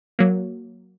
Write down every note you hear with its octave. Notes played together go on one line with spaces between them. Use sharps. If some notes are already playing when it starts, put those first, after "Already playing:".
F#3 A#3